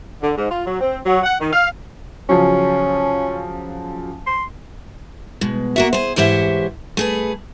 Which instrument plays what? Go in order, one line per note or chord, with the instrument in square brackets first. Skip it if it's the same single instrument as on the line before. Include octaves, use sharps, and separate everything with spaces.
[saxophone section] D3
G#2
F4
F#3
C4
F#3
F#5
D#3
F5
[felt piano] C#3 F3 F#3 [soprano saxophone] C#4
[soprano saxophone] C6
[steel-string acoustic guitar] B2 G#3
A#3 F#4 E5
G#4 C5
G#2 E3 G4 C5 C#5 E5
A3 G#4 B4